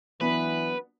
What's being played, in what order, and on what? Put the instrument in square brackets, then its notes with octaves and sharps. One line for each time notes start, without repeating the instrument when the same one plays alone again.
[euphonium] E3 [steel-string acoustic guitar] F#3 B3 D4 [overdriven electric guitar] B4